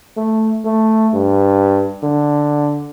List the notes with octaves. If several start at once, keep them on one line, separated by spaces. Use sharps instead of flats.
A3
A3
G2
D3